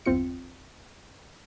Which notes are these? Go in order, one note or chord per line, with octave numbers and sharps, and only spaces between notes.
G1 E2 C4 F4 C#7